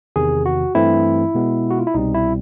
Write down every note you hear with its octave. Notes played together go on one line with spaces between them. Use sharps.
E2 C3 D#3 G#4
F#4
G2 E3 A3 C4 E4
B2 G#3 B3
F#4
F4
E4
C2 B2 G3 C4 D#4
E4